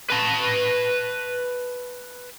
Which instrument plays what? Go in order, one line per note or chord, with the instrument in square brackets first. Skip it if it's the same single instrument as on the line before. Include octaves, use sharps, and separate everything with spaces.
[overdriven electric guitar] B4 A5